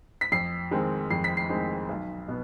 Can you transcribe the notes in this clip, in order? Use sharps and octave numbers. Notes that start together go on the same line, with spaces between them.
B6
F2 C7
D#3 G#3 C4
F2 C7
B6
C7
D#3 G#3 C4
B1
B2 B3